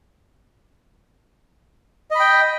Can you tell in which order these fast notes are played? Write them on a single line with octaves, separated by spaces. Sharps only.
D#5 B5 G5